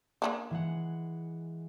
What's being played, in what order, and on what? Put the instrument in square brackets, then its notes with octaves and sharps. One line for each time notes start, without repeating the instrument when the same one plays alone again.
[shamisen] A#3 C#4 D4
[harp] E3 G#3 F#5